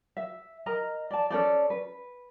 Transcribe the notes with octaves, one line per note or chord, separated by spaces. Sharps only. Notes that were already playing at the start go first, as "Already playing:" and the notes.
E5
A#4 D#5 A#5
D5 A5
C#4 A4 C5 D5
B4